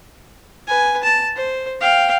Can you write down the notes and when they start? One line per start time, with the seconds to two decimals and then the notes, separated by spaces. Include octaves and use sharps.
0.68 B4 G#5
1.03 A5
1.36 C5
1.81 F5 G5